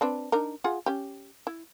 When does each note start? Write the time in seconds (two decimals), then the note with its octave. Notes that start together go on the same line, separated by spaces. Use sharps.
0.01 C4 D4 B4
0.32 D4 D#4 A#4
0.64 F4 G#4 F#5
0.86 C#4 G4
1.47 E4